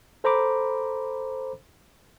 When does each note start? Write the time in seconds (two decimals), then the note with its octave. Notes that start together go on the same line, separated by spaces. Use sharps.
0.24 A4 C5 A#5 B5 D6